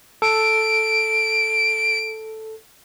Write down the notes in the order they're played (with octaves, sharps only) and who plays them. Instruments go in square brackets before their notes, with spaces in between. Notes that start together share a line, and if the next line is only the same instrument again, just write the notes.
[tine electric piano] A4 [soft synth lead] D7